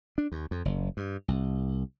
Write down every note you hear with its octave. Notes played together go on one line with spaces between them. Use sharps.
D4
D#2
F2
F#1
G2
C2